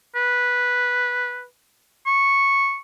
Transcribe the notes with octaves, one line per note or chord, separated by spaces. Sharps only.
B4
C#6